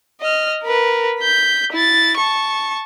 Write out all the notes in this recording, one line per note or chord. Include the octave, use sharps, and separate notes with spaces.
D#5 F6
A#4 B4
G6 B6
E4 A6
A5 C#6